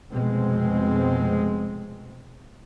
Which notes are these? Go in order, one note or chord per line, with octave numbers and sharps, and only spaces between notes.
F1 B2 G#3 C4